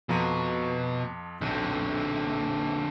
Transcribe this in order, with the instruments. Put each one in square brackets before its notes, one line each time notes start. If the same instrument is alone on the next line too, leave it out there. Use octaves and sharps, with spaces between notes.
[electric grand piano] F2 F3 A#5 [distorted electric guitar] B2
[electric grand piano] B1 [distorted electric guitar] D3 C4